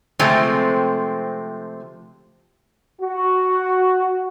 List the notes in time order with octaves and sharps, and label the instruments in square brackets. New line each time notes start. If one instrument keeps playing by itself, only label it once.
[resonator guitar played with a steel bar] C3 F3 G#3 A3 C4
[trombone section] F#4